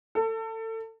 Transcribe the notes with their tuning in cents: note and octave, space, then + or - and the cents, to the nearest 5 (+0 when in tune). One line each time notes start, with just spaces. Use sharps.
A4 +25